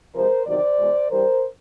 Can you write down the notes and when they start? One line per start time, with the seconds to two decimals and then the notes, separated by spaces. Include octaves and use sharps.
0.14 C3 F3 G#3 A#4 C5
0.46 E2 C3 D#3 F#3 C5 D5
0.78 E2 B2 G#3
1.11 G2 E3 G3 A#4 C5